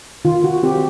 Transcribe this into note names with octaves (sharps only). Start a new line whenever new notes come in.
D#3 F4
F#4
C4 G4